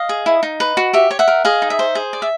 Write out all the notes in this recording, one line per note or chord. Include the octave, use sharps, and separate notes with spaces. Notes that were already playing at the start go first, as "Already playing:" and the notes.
Already playing: D#5 F5
G#4
E4
D#4
B4
F#4
G4 E5
C#5
E5 F#5
A#4
G#4 D#5 F5
D#4
E5
C5
G#4
D5
E5